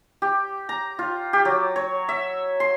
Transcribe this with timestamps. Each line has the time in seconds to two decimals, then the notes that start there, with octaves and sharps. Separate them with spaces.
0.22 G4
0.69 A#5
0.99 F4
1.33 G4
1.45 F#3
1.76 C#5
2.09 E5
2.60 C6